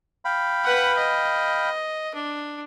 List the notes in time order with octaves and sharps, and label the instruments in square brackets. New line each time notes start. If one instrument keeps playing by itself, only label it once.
[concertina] F5 G5 B5
[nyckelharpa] B4 F#5
D#5
D4